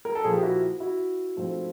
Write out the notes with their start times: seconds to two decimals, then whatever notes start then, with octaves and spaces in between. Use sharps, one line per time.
0.05 A#4
0.15 A4
0.24 A#2 F3 A#3 G#4
0.34 G4
0.43 E4 F#4
0.80 E4 F#4
1.36 G#2 F3 A3 C4